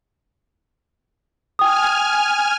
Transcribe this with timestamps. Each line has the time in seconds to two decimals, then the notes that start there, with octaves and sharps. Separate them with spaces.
1.59 G5 G#5 D#6 F6